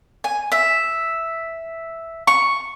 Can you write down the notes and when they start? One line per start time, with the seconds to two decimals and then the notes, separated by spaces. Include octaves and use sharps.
0.24 G#5
0.52 E5
2.27 C#6